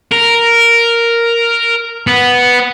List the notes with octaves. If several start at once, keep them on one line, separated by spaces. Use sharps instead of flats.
A#4
B3